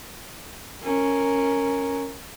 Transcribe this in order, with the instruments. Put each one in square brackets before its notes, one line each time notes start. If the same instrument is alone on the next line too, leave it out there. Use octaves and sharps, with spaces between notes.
[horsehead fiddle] C#4 A#4